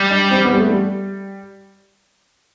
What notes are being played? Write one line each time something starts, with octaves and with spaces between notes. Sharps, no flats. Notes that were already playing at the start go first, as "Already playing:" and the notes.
Already playing: G3
D4
C4
B3
G3
A3
G3